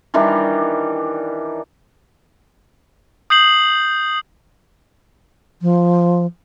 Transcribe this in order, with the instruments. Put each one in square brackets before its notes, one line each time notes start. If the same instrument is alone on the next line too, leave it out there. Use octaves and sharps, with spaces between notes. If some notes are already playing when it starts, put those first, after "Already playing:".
[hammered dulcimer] D#3 E3 G3 D4
[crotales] D#6 G6 C7 F#7
[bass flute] F3